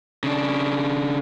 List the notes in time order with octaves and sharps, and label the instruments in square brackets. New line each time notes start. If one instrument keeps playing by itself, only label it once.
[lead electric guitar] C#3 D4